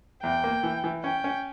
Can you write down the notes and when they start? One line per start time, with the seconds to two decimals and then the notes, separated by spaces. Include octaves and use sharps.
0.23 E2 G5
0.44 A#3
0.63 E3
0.84 E3
1.04 C#4 G5
1.24 C#4